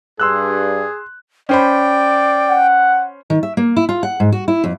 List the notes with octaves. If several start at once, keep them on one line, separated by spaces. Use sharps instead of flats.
G2 G#4 C6 E6 F#6
C#4 C5 D5 G5 B5
F#5
D#3
E5
A#3
E4
F4
F#5
G#2
F#4
E4
F2